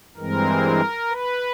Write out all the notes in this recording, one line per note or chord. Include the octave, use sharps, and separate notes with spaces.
G2 E3 G#3 C4 A#4
B4